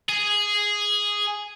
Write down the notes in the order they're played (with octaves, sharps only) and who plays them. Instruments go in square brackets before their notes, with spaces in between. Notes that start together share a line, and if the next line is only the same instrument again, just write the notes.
[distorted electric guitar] G#4